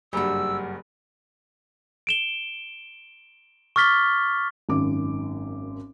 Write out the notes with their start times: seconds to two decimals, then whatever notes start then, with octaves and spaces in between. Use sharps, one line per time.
0.13 F#1 G2 G3 F#4 E6
2.07 D7 E7 G7
3.76 C#6 D6 F6 A6 B6 G7
4.69 G#1 F#2 D6